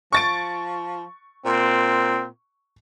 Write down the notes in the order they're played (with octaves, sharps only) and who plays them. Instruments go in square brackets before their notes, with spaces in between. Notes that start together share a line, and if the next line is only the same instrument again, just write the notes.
[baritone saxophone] F3 [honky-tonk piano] C#6 A6 D7
[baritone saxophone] A#2 [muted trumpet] C4